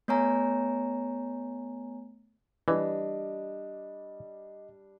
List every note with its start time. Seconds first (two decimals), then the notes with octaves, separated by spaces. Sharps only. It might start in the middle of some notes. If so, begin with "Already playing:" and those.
0.08 A3 B3 C#5 G#5 A#5
2.68 E3 G3 D4 D#5